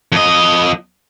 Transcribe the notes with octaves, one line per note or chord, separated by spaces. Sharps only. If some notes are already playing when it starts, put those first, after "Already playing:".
F2 D#5